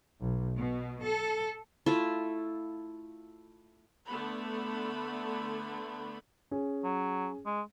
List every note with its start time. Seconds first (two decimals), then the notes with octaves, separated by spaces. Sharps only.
0.21 B1
0.57 B2
1.03 A4
1.86 A3 E4 F4 E5
4.07 D3 A3 B3 B5
6.51 C#4 G#4
6.84 F#3
7.46 G#3